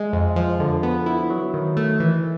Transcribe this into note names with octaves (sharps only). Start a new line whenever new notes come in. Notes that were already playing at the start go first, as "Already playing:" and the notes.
Already playing: G#3
F2
F3
D3
B3
E4
F#3
D#3
A3
E3